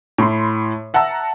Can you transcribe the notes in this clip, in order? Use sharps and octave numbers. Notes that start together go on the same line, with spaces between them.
A2 B5 C6
E5 F#5 A5 A#5 E6